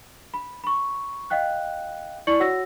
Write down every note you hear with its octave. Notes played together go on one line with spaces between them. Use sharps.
B5
B5 C#6
D#5 F5 G5 F#6
E4 D5 C#6 C#7 F#7
F#4 C#5 F#5 E6 A#6